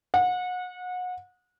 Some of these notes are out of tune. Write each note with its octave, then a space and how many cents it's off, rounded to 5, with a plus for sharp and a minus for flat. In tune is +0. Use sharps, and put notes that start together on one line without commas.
F#5 -30